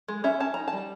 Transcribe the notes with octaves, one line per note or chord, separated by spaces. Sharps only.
G#3
C#4 E5
C#4 A5
D#4 A#5
A5
G3